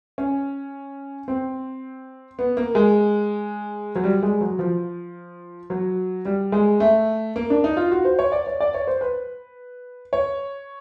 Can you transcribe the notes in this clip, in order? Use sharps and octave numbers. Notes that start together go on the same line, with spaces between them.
C#4
C4
B3
A#3
G#3
F#3
G3
G#3
F#3
F3
F#3
G3
G#3
A3
A#3
D4
D#4
F4
F#4
C5
C#5
D5
C#5
D5
C#5
C5
B4
C#5